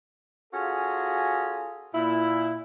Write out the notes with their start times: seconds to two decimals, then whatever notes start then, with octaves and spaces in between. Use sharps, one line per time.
0.53 C#4 F4 F#4 G#4 A4
1.95 A#2 E4